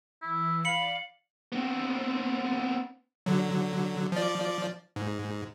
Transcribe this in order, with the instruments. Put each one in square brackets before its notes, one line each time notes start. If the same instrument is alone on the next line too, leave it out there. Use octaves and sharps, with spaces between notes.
[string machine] E3 [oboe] E4
[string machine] D5 [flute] F5 [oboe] B5 [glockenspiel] C#7 F#7
[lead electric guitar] B3 C4
[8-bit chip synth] D3 F#3
F3 D5
G#2